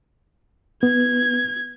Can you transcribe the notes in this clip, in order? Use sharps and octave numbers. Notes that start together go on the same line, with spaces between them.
B3 G#6